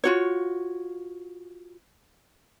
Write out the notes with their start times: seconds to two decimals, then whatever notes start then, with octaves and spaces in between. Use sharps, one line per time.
0.04 F4 F#4 C#5